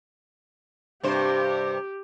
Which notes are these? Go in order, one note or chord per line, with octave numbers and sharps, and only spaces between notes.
G2 C3 G4 C5